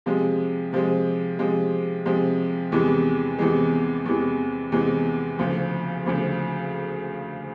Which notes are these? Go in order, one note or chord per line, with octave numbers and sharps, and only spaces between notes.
C3 F3 G#3
C3 F3 G#3
C3 F3 G#3
C3 F3 G#3
E2 C3 E3 G#3
E2 C3 E3 G#3
E2 C3 E3 G#3
E2 C3 E3 G#3
D2 C#3 F3
D2 C#3 F3